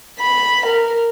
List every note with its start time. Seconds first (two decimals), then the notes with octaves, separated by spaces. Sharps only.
0.21 B5
0.66 A#4